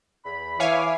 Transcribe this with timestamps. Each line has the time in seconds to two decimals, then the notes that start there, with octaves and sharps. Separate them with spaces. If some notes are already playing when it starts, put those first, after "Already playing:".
0.24 E2 B5
0.59 E3 C#5 E5 F5 G#5 B5 D6